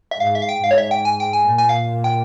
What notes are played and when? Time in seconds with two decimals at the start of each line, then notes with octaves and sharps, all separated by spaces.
0.11 E5
0.20 G#2 F5
0.35 E5
0.42 F5
0.49 G5
0.63 G#2 F5
0.71 C#5
0.78 E5
0.91 G5
1.05 G#5
1.20 G5
1.33 G#5
1.48 A#2
1.58 G#5
1.69 F5
2.04 G5